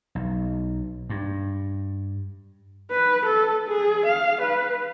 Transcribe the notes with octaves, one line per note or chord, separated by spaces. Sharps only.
B1
G2
B4
A4
G#4
F5
B4